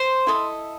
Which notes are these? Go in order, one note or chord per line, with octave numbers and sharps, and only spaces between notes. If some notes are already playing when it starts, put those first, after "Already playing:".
Already playing: C5 C6
E4 A4 D#5